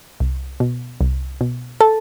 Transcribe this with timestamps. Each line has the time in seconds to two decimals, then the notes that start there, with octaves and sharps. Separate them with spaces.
0.20 C2
0.60 B2
1.01 C2
1.41 B2
1.81 A4 A5